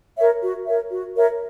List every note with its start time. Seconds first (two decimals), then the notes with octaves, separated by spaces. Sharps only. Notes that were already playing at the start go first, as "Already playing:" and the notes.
0.16 A#4 C#5 E5
0.41 F#4
0.65 A#4 C#5 E5
0.90 F#4
1.15 A#4 C#5 E5